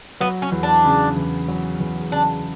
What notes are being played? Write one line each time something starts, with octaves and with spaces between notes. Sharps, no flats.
F#3 B3
C#4
E2
D4
C#3
E2
F#3
E2
C#3 D4